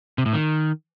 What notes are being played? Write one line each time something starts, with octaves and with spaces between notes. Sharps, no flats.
C3
A2
D#3